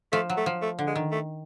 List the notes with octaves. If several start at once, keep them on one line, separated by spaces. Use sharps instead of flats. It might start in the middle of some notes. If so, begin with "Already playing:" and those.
F3 A3
F#3
A3
F3
A3
D3
G#3
D#3
A3